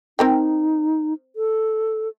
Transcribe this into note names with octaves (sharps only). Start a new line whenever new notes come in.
C4 D#4 A#4 G5
A4